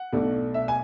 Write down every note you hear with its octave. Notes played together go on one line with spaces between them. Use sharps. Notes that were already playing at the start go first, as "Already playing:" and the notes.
Already playing: F#5
B1 B2 A3 D4
E5
G#5